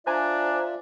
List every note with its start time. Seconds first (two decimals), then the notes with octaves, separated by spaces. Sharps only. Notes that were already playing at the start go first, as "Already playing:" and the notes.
0.07 D4 F4 C5 D5 E5 G#5 A#5